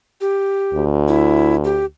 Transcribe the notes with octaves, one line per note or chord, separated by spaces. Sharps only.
G4
D2
E4
G4